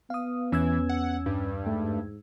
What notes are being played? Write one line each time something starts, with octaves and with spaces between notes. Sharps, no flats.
B3 F5 D#6
E2 E3 C#4 E6 G#6
F#5
G2
G#2 A3